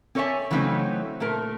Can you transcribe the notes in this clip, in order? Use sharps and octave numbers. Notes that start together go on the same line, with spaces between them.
C4 A4 C#5 D5 E5 G#5
C#3 E3 F#3 A3 C4 D#4
A#2 A3 A#4